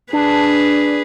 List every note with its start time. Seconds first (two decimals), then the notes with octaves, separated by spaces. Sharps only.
0.13 D4 G#4 B4